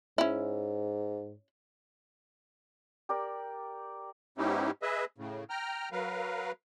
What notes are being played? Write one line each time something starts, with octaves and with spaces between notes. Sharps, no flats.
G#2 C#4 E4
G4 A#4 D5
G#2 B3 C#4 D#4 E4 G4
G#4 B4 D#5 E5
A2 C#3
G5 A#5 F6
F#3 A#4 B4 F5